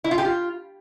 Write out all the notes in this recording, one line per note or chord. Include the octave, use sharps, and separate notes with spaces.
E4
F4
G4
F4